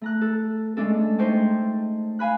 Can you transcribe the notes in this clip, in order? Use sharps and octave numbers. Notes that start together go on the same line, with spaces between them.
A3 A#5 F#6
A4
G#3 A3 C#4 D4 A4
A3 D#4 C5 C#5 G5 A5
F5 G#5 B5 F#6